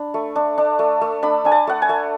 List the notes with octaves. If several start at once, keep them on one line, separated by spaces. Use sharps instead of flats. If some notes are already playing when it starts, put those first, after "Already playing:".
Already playing: D4 B5
A3
D4
D4
A3
A3
D4 B5
D4 G#5
A5
A3 F#5
G#5
A3